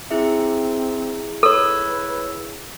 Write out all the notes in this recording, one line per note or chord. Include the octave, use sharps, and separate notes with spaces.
C4 E4 G#4 E5
A4 B4 C#5 E6